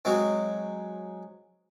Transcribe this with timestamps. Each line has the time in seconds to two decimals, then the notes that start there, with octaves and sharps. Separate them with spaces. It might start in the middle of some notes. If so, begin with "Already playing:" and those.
0.05 F#3 G#3 C4